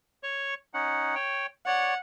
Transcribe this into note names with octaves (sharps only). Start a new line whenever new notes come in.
C#5 C#6
C#4 D#4 F#5
C#5 G5
C#5 D5 F#5